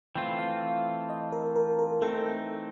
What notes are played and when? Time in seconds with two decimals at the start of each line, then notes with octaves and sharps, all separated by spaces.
0.15 E3 A3 C4 F4 G5
0.38 F5
1.09 D#5
1.32 A#4
1.56 A#4
1.79 A#4
2.02 E3 A3 C4 D#4 A4